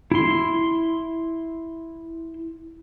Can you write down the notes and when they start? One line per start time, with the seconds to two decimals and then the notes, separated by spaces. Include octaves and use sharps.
0.12 E4 C6